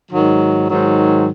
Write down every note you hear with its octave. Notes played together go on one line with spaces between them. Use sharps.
G#2 D#3 F#3
G#2 D#3 F#3